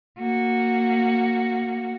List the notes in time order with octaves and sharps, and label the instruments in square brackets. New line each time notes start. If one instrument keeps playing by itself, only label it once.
[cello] A#3 F#4